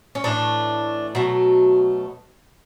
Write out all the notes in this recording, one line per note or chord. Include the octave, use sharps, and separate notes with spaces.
C#4
A2 E3 A3 D4
B2 F#3 A3